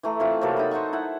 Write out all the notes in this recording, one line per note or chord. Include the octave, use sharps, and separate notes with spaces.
E3 A3 A#5
E3 C4 F4 A5
C3 F#3 A#3 A4
D#4 D#5 B5
C5 D#5 F#5 C#6
E4 F#5